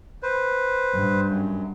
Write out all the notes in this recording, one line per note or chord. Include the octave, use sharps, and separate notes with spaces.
B4 C5
G2
F#2